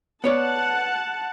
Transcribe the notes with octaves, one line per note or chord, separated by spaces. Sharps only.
B3 C#5 D5 F#5 A5